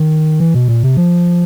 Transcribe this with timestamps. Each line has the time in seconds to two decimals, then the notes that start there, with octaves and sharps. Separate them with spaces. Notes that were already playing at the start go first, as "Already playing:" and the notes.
Already playing: D#3
0.40 E3
0.54 B2
0.68 A#2
0.83 C3
0.97 F3